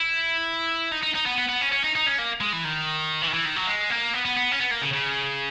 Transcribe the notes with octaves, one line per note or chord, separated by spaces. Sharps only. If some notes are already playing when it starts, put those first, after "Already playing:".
Already playing: E4
D#4
D#4
D#4
B3
B3
B3
C#4
C#4
D#4
D#4
C#4
A#3
G#3
E3
D#3
E3
D#3
E3
D#3
F#3
G#3
A#3
B3
B3
B3
C#4
B3
A#3
C#3
C#3